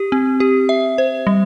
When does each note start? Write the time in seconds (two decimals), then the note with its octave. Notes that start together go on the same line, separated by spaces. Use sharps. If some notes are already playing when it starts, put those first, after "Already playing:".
Already playing: G4
0.12 C4
0.40 G4
0.69 E5
0.98 C5
1.27 G3